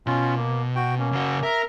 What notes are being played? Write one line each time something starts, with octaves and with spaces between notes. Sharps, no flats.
B2 C#4 F4
A#3
F#4 G5
A#3 C#4
C#3 F#4
A#4 E5